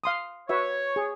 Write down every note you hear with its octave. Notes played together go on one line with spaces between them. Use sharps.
F5 C6 D#6
F#4 B4 C#5 E5
G#4